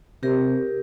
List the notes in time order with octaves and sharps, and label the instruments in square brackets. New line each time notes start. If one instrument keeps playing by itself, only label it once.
[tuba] C3 [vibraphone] G4 A#4